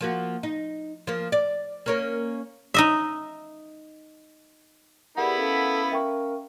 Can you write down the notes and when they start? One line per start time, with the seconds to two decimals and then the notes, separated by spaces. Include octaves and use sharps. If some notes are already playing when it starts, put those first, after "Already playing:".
0.01 F3 A#3 F#4
0.43 D#4
1.07 F3 A#3
1.32 D5
1.86 A#3 C#4 A#4
2.74 D#4 D#5 E5
5.17 B3 E4 G4 G#4 A#4 D5 F#5
5.38 C#4 A4 F5
5.92 A#4 E5 G5 C#6